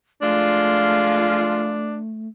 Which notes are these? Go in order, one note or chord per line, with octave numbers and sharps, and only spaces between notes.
F3 G#3 A3 D4 F4